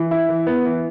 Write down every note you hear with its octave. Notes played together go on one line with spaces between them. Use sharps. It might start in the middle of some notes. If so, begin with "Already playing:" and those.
Already playing: E3
E4
E3
B3
E3